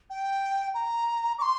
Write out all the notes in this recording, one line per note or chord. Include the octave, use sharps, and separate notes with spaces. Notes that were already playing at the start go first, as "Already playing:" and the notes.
G5
A#5
D6
C6